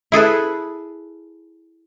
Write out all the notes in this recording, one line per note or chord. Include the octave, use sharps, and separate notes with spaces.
E4 G#4 A4 B4